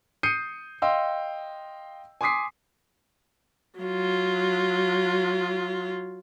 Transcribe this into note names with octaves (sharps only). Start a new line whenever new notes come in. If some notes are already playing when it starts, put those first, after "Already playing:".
D#6 G6 C7 C#7 D#7
D#5 F5 G5 C6 E6
G#5 C6 D6 D#6 B6 C7
F#3 F4